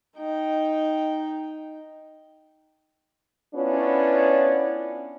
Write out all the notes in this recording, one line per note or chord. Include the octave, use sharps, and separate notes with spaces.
D#4 G5
B3 C#4 D4 E4 F4 C#5